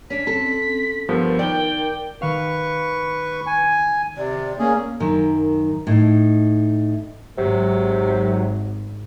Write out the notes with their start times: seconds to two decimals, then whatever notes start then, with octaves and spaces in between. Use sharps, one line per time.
0.10 C#4 D4 B6
0.27 C4 C#4 A4
1.09 G2 F3 B3 A#4
1.39 D#3 D5 G5
2.22 D#3 B4 F5 C#6
3.46 G#5
4.18 C3 D5
4.59 A#3 C#4 G#4
5.00 F#2 D#3
5.87 A2 D#4
7.38 G#1 C3 F#3